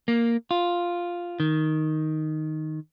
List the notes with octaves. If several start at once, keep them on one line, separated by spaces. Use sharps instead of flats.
A#3
F4
D#3